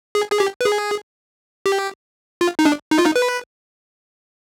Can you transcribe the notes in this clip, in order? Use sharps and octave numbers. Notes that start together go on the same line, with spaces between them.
G#4
G#4
G4
B4
G#4
G4
F4
D#4
D4
D#4
F4
D#4
B4